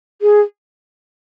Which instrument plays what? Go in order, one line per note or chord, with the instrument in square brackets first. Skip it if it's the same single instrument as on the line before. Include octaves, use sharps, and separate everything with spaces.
[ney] G#4